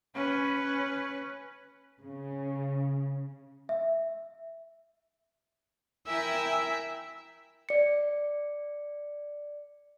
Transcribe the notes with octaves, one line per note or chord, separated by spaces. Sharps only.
C#4 B4
C#3
E5
E4 A#4 E5 G5 G#5 E6
D5 C#7